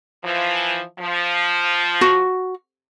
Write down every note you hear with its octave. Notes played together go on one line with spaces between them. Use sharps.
E3 F3
F3
F#4